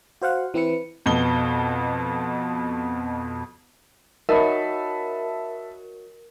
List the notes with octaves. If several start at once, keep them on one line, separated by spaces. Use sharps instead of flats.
F#4 C5 F5 F#5
E3 C4 E4 B4 C#7
F2 B2 G7
D#4 F#4 A#4 C#5 E5 A5 B5